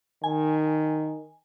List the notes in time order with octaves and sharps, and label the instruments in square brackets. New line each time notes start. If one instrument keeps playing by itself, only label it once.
[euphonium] D#3 [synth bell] G#5